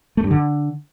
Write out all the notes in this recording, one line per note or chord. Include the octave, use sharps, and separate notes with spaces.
A3
G2
D3